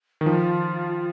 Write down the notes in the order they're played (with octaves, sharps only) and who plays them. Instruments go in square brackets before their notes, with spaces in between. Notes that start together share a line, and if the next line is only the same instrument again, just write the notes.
[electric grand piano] D#3
[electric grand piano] F3 [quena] F4